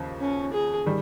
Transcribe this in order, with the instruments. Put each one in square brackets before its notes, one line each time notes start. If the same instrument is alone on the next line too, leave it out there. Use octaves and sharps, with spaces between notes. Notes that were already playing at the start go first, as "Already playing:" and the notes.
Already playing: [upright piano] D#2 C#3 F3
[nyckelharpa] C#4
G#4
[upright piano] D#3 G3